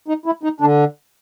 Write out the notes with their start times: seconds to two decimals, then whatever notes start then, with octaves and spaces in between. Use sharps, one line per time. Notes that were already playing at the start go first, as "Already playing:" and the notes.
0.08 D#4
0.26 E4
0.43 D#4
0.60 D3 D4